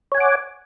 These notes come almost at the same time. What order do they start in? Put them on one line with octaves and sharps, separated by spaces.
C#5 G#5 F#5 D6